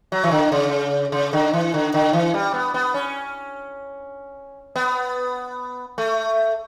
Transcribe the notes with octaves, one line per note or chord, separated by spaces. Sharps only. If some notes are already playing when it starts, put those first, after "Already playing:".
F#3
E3
D3
C#3
C#3
D3
E3
D3
D3
E3
G3
B3
B3
C#4
B3
A3